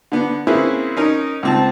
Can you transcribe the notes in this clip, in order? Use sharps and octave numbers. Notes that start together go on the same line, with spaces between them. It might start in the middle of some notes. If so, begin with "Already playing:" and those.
D3 B3
A#3 C4 C#4 E4 G#4 B4
C#4 D#4 A#4
C#2 C4 A5